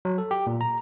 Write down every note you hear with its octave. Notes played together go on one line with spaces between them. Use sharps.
F#3
A4
G4
A#2
A#5